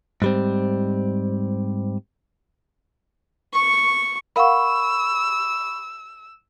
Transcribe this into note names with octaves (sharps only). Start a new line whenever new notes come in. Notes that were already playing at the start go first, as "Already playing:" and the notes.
G#2 G3 C4
C#6
A#4 F5 F#5 B5 C#6 E6